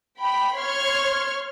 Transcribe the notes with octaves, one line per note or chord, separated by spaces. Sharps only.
G5 B5
C#5 C6 C#6 F6 G#6